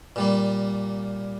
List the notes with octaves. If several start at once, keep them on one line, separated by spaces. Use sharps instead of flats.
A#2 G3 A#3